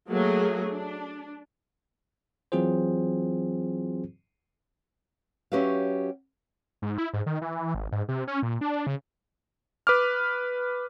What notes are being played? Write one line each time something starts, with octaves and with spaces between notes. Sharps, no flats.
F#3 A3 A#3 G#4
D4
E3 F#3 C4 F4 G#4 C5
F#3 C#4 G4 B4 E5 F5
G#2
E4
G#2
D#3
E3
G#1
G#2
C3
C#4
A#2
D4
C#3
B4 D6 F6